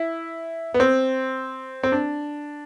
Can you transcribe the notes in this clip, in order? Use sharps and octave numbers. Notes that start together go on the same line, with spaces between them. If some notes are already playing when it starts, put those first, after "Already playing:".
Already playing: E4
B3
C4
C4
D4